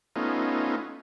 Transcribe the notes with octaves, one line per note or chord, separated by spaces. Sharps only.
A3 B3 C#4 D#4 F4